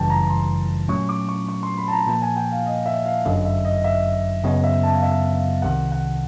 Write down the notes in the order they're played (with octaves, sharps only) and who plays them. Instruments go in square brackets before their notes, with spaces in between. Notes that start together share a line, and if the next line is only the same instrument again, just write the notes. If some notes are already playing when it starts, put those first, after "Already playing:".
Already playing: [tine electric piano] G1 F#2 C#3 E3 G3 [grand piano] G5 A5
[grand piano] A#5
C6
[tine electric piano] A#2 F#3 A3 C#4 [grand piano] C#6
[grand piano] D6
C#6
C#6
C6
B5
A5
A#5
[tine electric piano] A#2 F3 A#3 [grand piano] A5
[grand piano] G#5
G5
F5
D#5
E5
F5
[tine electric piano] G1 F#2 D3 F#3 [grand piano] D#5
[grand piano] E5
D#5
D#5
E5
[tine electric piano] F#2 C#3 F#3 B3 [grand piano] D#5
[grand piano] E5
A5
F5
E5
F5
[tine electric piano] C2 C3 D#3 [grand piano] F#5
[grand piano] F#5